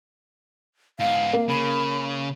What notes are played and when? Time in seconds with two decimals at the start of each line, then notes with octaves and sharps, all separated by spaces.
1.00 G#2 B3 F5
1.33 A#3
1.49 C#3 B5